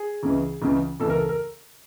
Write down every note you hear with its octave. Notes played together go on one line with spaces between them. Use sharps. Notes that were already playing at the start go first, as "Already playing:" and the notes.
Already playing: G#4
C#2 C#3 E3
C#2 C#3 E3
C#2 C#3 E3 A4
A#4
A4
A#4